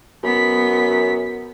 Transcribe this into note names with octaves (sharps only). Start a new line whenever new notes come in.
F#2 B3 B6